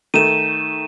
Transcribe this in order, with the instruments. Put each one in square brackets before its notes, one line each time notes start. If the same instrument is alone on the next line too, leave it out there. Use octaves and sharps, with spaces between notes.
[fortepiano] D#3 A3 [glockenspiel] D#7 E7